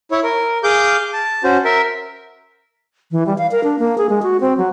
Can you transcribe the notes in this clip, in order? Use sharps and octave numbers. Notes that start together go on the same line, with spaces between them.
E4 C#5
A#4
G#4 F5 D6 G6
A5
C#4 F#4 C5
A#4 E5
E3
G3
F5
A#4
D4
A#3
G#4
G#3
F#4
C4
F#3